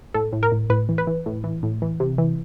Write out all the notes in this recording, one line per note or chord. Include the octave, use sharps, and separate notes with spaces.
A2 A4
A2
A#4
A2
A2 B4
E3
B4
E3
A2
E3
A2
E3
C3
E3